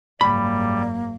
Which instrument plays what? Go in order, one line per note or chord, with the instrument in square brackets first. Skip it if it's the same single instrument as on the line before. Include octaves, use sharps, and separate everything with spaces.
[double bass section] F#1 G#2 [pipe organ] G3 [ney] A#3 [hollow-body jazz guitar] B5